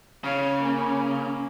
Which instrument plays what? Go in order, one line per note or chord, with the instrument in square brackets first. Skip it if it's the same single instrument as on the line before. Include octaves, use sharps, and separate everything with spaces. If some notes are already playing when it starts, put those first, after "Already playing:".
[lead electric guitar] C#3 [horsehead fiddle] C#5 F5
[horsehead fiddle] A#3 C#4